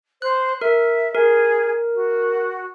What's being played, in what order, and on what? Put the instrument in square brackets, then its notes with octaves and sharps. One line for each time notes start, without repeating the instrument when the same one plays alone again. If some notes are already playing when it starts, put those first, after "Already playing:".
[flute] C5 [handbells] F#6
[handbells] A#4 [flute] E5
[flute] G#4 [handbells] A#4
[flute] F#4